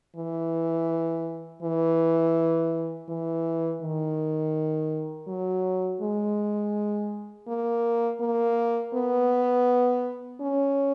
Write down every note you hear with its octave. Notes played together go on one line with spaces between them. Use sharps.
E3
E3
E3
D#3
F#3
G#3
A#3
A#3
B3
C#4